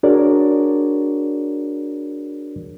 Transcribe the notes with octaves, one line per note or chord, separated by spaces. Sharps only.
D4 F#4 G#4 A#4 C#5 D5